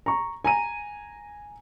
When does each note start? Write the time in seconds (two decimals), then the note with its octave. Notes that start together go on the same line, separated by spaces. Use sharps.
0.06 A#5 C#6
0.45 G#5 A#5 D#7